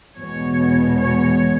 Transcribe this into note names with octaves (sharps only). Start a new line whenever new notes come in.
E2 B2 G#3 C#5
C#5